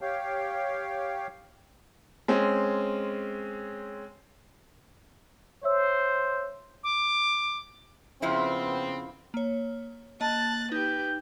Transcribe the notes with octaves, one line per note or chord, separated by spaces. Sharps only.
G4 C#5 F5 G5
G#3 C4 C#4
C5 C#5 E5 E6
D6
F2 C#3 F3 B3 C4 E4
A#3 C#5
A#3 D#5 A5 F#6 A6
D#4 G4 B4 G6